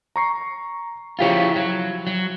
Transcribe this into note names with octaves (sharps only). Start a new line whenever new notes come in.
A#5 C#6 C7
C#3 F3 E4 F4 G4 C#5
F#3
F#3